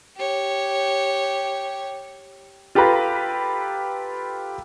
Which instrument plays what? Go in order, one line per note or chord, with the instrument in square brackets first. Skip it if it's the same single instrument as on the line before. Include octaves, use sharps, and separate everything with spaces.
[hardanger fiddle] G4 C#5
[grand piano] F4 G4 A4 B4 A#5